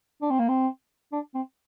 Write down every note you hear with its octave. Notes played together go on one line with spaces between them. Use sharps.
D4
C4
A#3
C4
D4
C4